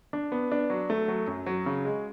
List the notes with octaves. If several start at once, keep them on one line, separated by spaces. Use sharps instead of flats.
D4
B3
D4
F#3
A3
F#3
F#2
F#3
C#3
G#3